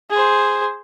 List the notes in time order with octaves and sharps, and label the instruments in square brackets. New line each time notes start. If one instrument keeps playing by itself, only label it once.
[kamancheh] G#4 C5